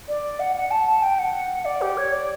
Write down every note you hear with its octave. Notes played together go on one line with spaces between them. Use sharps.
D5
F#5
F#5
A5
A5
G5
F#5
D5
G4
C#5
D5